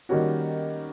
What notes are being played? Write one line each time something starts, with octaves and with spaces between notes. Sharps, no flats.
D#3 G3 A#3 C#4 F#4